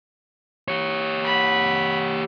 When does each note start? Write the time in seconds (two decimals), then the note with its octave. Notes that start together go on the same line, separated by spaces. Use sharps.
0.68 G4 C#5
1.24 F#5 B5